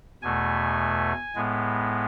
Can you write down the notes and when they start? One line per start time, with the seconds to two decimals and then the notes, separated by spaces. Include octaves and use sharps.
0.22 E2 B2 A3 G#5
1.35 A2 G#3 B3